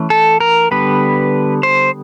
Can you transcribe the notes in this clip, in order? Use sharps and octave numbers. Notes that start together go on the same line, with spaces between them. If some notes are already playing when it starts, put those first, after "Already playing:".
Already playing: E3 A3 C#4
A4
A#4
D3 G3 B3 B4
C5